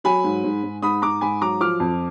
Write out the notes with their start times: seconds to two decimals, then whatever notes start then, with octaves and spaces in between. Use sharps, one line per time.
0.04 F#3 G#5 B5
0.24 G#2
0.44 G#2
0.63 G#2
0.82 G#2 B5 D#6
1.02 G#2 A#5 D6
1.21 G#2 G#5 B5
1.41 F#3 A#5 D6
1.60 F3 D6 F6
1.80 F2